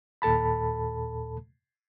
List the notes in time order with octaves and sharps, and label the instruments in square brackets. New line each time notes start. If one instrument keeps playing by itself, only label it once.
[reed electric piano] D#2 A#2 A4 A5 B5